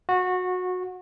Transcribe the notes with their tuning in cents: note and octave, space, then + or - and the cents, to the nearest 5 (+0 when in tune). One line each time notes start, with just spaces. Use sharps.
F#4 -20